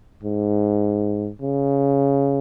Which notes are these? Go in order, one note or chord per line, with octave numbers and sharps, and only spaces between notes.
G#2
C#3